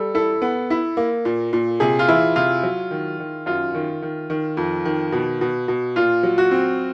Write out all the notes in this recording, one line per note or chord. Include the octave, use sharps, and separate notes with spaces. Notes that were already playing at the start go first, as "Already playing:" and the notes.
Already playing: G3 A4
E4 A4
B3
E4
A#3
A#2
A#2
C3 G#4
F4
E3 E4
C3 F4
F#3
D#3
D#3
F#2 F4
D#3
D#3
D#3
F2
D#3
B2
B2
B2
A#2 F4
F#3
F#4
C4